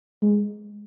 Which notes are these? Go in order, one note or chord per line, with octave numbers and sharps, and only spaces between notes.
G#3